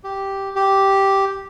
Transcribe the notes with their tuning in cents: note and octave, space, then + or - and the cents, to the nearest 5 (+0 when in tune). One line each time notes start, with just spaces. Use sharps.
G4 -5
G4 -5